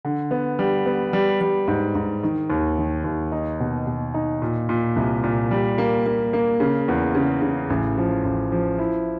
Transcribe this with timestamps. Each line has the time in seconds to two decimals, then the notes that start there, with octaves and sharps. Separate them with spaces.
0.05 D3
0.31 B3
0.59 G3
0.86 B3
1.13 G3
1.41 G3
1.68 G#2
1.95 G#2
2.23 D#3
2.50 D#2
2.78 D#3
3.04 D#2
3.32 D#4
3.60 B2
3.87 B2
4.14 D#4
4.42 A#2
4.69 A#2
4.96 C2
5.24 A#2
5.51 G3
5.78 A#3
6.06 A#3
6.33 A#3
6.60 C#3
6.88 E2
7.15 C#3
7.42 C#3
7.70 A1
7.98 F3
8.25 A1
8.52 F3
8.79 E4